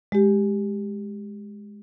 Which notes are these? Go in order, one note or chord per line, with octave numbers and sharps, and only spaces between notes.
G#3 G4